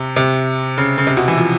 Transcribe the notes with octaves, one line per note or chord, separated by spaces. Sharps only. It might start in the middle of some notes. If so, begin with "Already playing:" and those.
Already playing: C3
C3
C#3
C#3
C3
B2
E3
F3